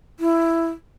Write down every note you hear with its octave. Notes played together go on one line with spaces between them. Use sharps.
E4